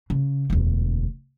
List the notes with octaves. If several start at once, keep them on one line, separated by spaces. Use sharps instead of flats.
C#3
E1 D2